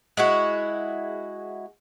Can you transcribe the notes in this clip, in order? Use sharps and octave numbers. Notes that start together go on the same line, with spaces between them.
G#3 E4 F#4